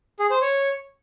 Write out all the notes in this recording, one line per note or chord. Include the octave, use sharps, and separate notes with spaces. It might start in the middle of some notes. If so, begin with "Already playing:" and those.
G#4
C5
C#5